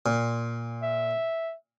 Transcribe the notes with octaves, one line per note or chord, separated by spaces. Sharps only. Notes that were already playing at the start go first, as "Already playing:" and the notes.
A#2
E5